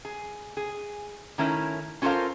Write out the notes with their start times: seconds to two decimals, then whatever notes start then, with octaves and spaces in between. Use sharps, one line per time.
0.05 G#4
0.57 G#4
1.38 D#3 A3 C#4 E4 A#4
2.02 C#4 F4 A4 A#4 C5 F5